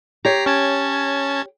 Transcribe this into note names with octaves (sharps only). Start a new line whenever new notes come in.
G4 C#5 A#5 B6 C7
C#4 A5 G#6